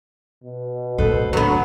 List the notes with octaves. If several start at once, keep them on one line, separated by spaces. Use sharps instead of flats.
B2
A2 C3 A4 B4 C5
D2 C#3 F#3 B3